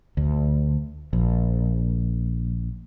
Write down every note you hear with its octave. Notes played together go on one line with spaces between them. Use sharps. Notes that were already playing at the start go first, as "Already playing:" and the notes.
D2
A#1